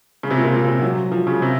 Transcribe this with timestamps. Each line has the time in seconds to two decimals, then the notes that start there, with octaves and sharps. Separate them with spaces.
0.23 C#3
0.30 C3
0.37 A#2
0.45 C3
0.53 A#2
0.68 C3
0.82 F#3
1.12 F3
1.27 C#3
1.42 C3